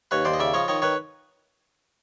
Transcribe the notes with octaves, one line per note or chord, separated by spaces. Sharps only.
D#2 B4 C#5
D#2 C5 D5
D#5
C#3 D5 E5
F3 C#5 D#5
D#3 C#5 D#5
D#3 B4 C#5